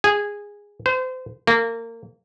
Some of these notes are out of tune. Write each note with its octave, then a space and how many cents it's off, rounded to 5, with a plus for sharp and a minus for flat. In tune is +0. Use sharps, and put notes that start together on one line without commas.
G#4 -15
C5 -30
A#3 -25